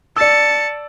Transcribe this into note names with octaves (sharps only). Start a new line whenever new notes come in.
D5 A5 E6 C#7